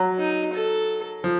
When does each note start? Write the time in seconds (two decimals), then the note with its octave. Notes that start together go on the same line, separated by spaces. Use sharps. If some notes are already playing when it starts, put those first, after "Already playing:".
Already playing: F#3
0.19 D#4
0.53 A4
1.24 F3